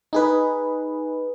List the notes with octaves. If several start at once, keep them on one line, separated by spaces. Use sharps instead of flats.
D#4 G#4 B4